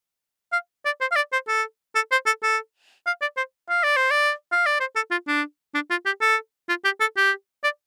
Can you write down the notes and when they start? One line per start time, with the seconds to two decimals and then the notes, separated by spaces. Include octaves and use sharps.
0.53 F5
0.85 D5
1.01 C5
1.12 F5
1.16 D5
1.33 C5
1.48 A4
1.95 A4
2.12 C5
2.26 A4
2.43 A4
3.07 F5
3.21 D5
3.37 C5
3.70 F5
3.83 D5
3.97 C5
4.11 D5
4.52 F5
4.66 D5
4.80 C5
4.96 A4
5.11 F4
5.27 D4
5.74 D4
5.90 F4
6.06 G4
6.21 A4
6.69 F4
6.85 G4
7.00 A4
7.17 G4
7.64 D5